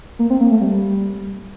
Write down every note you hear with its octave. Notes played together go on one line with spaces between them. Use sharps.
A#3
C4
A#3
A3
G3